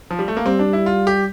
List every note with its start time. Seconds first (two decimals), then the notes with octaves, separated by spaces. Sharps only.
0.11 F3
0.19 G3
0.28 A3
0.37 A#3
0.46 G3 C4
0.59 D4
0.73 E4
0.86 F4
1.07 G4